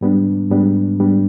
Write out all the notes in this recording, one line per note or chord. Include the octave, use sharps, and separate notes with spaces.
G#2 G3 B3 D4
G#2 G3 B3 D4
G#2 G3 B3 D4